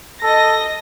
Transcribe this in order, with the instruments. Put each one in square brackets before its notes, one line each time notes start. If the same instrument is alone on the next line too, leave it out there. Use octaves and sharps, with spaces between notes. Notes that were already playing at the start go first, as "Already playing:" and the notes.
[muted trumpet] A4 [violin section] D#5 A#6